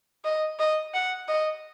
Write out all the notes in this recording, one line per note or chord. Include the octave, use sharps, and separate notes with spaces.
D#5
D#5
F#5
D#5